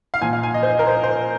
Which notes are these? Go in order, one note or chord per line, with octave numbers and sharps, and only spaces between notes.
F5
A#2 F3 G#5
F5
G#5
D#5
C5
A#4
C5
C5